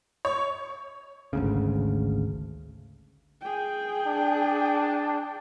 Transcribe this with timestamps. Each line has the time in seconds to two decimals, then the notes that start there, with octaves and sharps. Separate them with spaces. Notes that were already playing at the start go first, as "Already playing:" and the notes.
0.25 C#5
1.33 G#1 D2 C#3
3.41 G#4 G5
4.07 D4